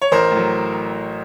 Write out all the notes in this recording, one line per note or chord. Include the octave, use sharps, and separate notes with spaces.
C#5
A1 A#4 C5
A2 F#3